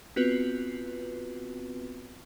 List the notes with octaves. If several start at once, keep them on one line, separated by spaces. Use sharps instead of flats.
B3 C4 F4 F#4 B4